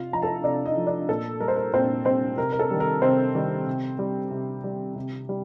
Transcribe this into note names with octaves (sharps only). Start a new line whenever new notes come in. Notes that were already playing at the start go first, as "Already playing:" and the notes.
Already playing: C3 F4 F5
F3 A#5
A4 A5
C3 D4 D5
D#4 D#5
F3
D4 D5
A#2 A4
G3 A#4
C5
A#4
A#2 C4 C5
G3 C4 C5
C3 A#4
A#4
A4
D#3 G3
A#4
C3 C4 C5
D#3 G3
C3
G3
C3
G3
C3
G3